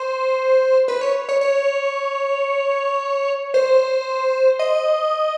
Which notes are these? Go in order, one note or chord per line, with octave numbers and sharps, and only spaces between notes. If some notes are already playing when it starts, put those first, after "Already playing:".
Already playing: C5
B4
C#5
C#5
C#5
C5
D#5